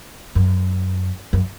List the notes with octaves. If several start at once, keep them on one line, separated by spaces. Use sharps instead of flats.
F#2
F#2